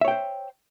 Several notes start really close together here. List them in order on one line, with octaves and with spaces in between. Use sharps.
E5 C#5 G5 C5